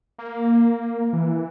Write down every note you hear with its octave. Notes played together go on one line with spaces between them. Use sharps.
A#3
E3